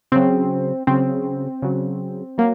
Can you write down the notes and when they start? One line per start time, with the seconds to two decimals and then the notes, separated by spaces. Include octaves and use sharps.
0.12 C#3 F#3 C4
0.87 C#3 F#3 C4
1.62 C#3 F#3
2.38 F#3 A#3